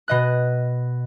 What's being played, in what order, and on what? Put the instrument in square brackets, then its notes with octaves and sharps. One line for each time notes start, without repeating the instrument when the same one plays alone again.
[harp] B2 D#5 F#6